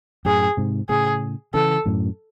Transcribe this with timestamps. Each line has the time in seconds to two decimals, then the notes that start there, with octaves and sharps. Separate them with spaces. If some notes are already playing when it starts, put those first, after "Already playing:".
0.25 F#2 A2 G#4
0.57 G#2 C3
0.89 A2 C#3 G#4
1.54 C#3 E3 A4
1.86 F#2 A2